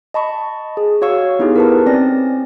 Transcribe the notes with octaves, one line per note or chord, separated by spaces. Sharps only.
D#5 A5 B5 C#6
G#4
F#4 C#5 F5 C#6 E6
B3 D#4 E4 G4 G#4
A#4 B4 A5
C4 C#4 D5 A#6